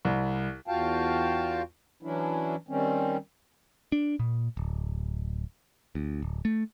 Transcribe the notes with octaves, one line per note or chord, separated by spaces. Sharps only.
C2
E2 F4 F#4 F5 G5 A5
E3 F#3 C#4 D4 E4
D#3 G3 C4 C#4
D4
A#2
D1
D2
D1
A3